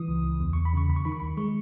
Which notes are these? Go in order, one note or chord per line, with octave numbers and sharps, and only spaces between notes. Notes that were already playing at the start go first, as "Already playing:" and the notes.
Already playing: E3 D#6
C#2
C#2
E2
E2 C#6
B5
C#3 C#6
D#2 B5
C#6
D#3 B5
C#6
D#2 B5
G#3 C#6